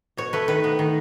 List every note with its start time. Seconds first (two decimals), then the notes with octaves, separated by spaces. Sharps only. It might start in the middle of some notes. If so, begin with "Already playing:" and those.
0.17 B2 C#5
0.33 A3 B4
0.48 D#3 B4
0.64 B3
0.79 D#3